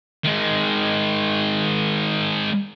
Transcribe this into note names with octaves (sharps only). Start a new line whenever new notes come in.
D#3 G#3